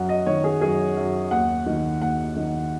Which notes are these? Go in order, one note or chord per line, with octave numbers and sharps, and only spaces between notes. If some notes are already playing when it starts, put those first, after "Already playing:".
Already playing: F#2 F#5
D#5
D#3 C#5
G#4
F#2 G#4
F#2
D#2 F#5
D#3
D#2 F#5
D#3